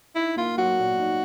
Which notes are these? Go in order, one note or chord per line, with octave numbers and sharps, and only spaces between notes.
D#4 E4
A#3 F4
F#3 F#4
A#2
D#4